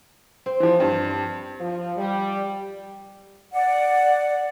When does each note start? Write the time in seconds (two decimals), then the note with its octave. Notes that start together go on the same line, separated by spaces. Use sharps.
0.46 C4
0.60 E3 F3
0.80 G2
1.60 F3
1.97 G3
3.53 D5 F#5